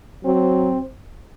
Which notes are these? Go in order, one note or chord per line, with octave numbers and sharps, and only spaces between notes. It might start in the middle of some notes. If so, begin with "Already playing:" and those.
F#3 C4